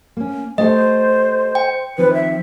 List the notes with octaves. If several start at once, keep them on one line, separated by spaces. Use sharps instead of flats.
A#3 C#4
A3 G4 A4 C5 D#5
G5
D#3 F3 C4 B4
E5